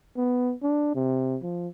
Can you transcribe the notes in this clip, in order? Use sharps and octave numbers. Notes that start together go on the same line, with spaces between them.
B3
D4
C3
F3